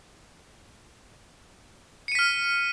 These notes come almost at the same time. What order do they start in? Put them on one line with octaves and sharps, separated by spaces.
C#7 D#7 B6 F6